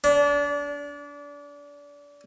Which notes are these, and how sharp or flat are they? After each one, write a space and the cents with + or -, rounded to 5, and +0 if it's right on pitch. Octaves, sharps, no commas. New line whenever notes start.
D4 -30